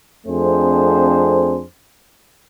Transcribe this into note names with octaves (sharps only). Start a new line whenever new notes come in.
F2 A3 C4 D4 G#4 C5